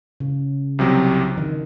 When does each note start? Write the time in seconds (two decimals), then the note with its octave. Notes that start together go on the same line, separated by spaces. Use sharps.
0.20 C#3
0.79 C2 C3 F#3
1.38 D#3